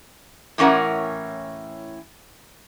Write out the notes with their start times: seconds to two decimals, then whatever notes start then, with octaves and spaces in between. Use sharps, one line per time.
0.58 A2 E3 C#4 A#4 F#5